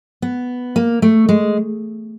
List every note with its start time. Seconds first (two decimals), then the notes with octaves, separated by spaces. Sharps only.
0.22 B3
0.76 A#3
1.02 A3
1.29 G#3